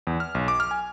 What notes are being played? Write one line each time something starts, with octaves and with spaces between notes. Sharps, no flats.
E2
F6
B1
D6
F6
G#5